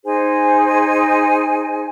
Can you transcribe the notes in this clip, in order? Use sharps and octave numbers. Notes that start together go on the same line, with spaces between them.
D#4 G#4 C5 G#5